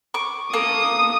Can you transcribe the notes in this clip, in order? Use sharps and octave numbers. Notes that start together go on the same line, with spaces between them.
C#6 D6
A#3 A4 D#6